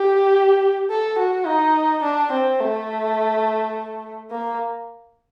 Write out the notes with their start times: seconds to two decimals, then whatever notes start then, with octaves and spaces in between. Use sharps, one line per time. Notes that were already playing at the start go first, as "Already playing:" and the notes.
Already playing: G4
0.90 A4
1.19 F#4
1.46 D#4
2.03 D4
2.32 C4
2.60 A3
4.31 A#3